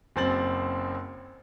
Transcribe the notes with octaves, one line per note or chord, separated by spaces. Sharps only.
F#1 F#2 C4 C5 A6 F#7